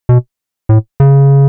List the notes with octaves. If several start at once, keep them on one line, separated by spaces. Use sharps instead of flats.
B2
A2
C#3